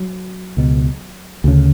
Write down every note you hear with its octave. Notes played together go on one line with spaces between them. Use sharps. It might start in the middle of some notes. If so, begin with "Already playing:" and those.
Already playing: F#3
C#2 B2
D2 C#3